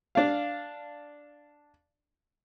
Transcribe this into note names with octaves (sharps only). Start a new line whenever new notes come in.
D4 F5